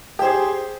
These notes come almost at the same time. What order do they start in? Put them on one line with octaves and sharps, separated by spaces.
G4 C5 G#4